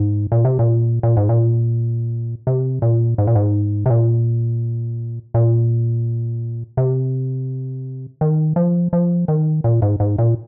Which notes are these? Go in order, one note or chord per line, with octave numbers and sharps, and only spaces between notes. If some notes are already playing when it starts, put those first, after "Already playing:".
Already playing: G#2
A#2
C3
A#2
A#2
G#2
A#2
C3
A#2
G#2
A#2
G#2
C3
A#2
A#2
C3
D#3
F3
F3
D#3
A#2
G#2
G#2
A#2